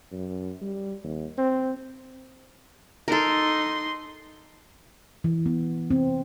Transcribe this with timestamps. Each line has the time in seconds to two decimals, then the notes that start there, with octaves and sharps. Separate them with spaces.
0.12 F#2
0.61 G3
1.04 D#2
1.38 C4
3.08 D#4 A4 A#4 C6
5.24 E3
5.46 B3
5.90 C4